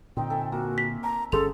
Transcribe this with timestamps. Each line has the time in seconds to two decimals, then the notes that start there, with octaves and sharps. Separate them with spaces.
0.17 A#2 D3 C4 D#4 G5
0.30 A4 E5 G#5
0.52 A#3 F#4
0.78 B6
1.03 A5 A#5
1.32 G1 G2 C#4 G#4 A4 C6 F7